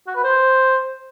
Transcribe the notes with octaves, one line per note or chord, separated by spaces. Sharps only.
F#4
B4
C5